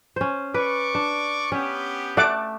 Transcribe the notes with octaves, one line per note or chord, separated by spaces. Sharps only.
C#4 C5
B4 D5 C#6 D6
D4
B3 C#4 G4
A3 D5 F#5 D6